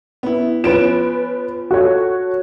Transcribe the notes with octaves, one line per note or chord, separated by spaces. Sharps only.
B3 E4
F3 B3 C#4 B4 D7 E7
F#4 A4 C#5